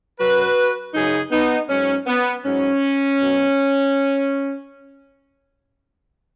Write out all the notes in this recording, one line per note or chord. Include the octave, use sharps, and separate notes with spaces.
F#2 F#3 F#4 B4
F#2 C#3 F#3 D#4 G#4
B3 D#4
G#2 F#3 C#4
B3
G#2 F#3 C#4
B2 F#3